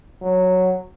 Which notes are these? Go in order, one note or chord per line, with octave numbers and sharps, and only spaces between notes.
F#3